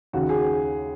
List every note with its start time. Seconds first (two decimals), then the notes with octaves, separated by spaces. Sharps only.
0.13 D#2 C#3 F#4
0.29 G#4